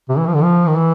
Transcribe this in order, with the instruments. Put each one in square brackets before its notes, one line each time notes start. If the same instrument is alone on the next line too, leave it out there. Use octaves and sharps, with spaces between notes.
[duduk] C3
E3
F3
D3
F3
D#3
E3